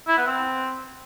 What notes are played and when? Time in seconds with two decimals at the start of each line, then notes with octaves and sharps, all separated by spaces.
0.08 E4
0.17 B3
0.27 C4